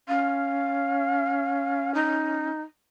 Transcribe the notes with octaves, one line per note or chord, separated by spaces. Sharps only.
C#4 F5
D#4